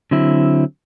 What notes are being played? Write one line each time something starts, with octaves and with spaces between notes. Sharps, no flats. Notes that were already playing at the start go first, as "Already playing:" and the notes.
D3 F#3 C4 E4